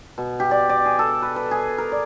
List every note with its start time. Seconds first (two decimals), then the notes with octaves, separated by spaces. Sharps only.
0.18 B2
0.40 G4
0.51 D5
0.69 D5
0.86 G#4
0.99 A4
1.22 B4
1.36 B4
1.51 G#4
1.78 A#4
1.92 D5